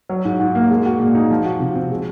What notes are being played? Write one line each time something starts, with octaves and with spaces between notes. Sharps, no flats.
F#3
G#2
G#2
A#3
G#3
F#4
A#2
D#4
F3
F#4
C3
C4
G#3